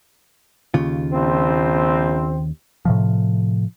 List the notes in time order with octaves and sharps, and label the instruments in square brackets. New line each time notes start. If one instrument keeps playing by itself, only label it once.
[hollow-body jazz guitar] D#2 C#3 F4
[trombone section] A#1 C4
[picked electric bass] A2 C3 F3